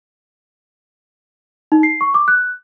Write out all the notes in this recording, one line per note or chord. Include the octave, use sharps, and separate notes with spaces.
D#4
C7
C#6
D6
F#6